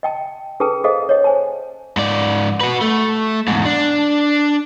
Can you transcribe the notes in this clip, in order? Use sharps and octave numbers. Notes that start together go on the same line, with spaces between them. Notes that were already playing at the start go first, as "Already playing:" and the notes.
D#5 G5 A5
C#4 G#4 A4 B4 G5 A5
G#4 A4 C5 D#5 F5
C#5 D#5
C5 G#5 A5
G#2 D5
F#4 B4
A3
E2 G#2
D4